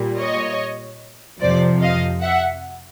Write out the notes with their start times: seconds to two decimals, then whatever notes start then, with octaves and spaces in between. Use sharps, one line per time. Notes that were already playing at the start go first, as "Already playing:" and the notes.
Already playing: A#2 G3
0.20 C#5 D#5
1.41 F2 C3 F3 C5 D5
1.82 D#5 F5
2.22 E5 F#5